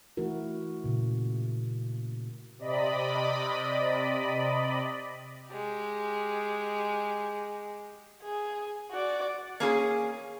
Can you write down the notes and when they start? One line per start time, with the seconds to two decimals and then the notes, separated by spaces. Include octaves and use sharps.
0.17 E3 A3 E4 F#4 A#4
0.84 A#2 C#3
2.59 C3 D5 D#5 B5
5.48 G#3 G4
8.23 G#4
8.91 F#4 D5
9.60 A#3 C#4 G#4